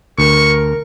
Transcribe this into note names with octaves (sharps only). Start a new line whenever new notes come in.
D2 A#4 C#6